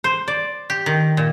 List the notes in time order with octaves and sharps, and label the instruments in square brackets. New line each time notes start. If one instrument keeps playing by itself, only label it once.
[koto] C5
D5
G4
D#3
A#2